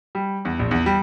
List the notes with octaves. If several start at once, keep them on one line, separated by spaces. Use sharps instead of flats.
G3
E2
A#1
E2
G3